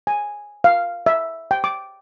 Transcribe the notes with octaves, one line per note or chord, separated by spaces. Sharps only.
G#5
F5
E5
G5
D6